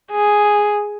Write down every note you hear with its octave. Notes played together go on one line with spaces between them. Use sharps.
G#4